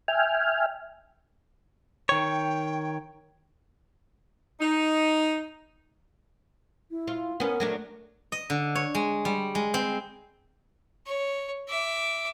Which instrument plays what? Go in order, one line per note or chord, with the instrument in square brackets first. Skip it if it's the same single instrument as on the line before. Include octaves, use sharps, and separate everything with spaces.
[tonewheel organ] E5 G5 G#5 F6
[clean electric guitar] D#3 C#5 [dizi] G5
[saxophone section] D#4
[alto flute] E4
[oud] F4
[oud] B3 C#4 [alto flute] A#4
[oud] F#3 A3 D4
[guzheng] D#5
D3
C#5
G#3
G3
G#3
C4
[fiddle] C#5
E5 D6